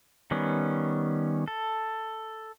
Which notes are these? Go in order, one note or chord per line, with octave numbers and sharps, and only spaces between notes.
D#3 G3 B3 C#4
A4